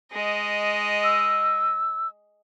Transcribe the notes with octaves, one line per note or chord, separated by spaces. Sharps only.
G#3 D#5
E6